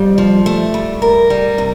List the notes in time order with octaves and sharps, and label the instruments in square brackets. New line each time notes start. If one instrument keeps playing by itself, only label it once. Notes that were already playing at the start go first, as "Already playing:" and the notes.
Already playing: [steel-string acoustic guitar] F2 [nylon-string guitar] G3
[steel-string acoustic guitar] F3
A3
G3
A#4
G3
C3